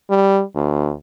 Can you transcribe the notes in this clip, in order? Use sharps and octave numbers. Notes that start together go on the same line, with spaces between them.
G3
D2